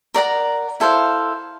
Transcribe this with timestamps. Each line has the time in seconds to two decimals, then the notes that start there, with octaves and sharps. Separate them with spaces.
0.14 A#4 D5 F#5 A#5
0.80 E4 A4 C5 F5